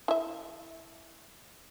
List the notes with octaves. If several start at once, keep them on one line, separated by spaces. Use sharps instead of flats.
E4 E5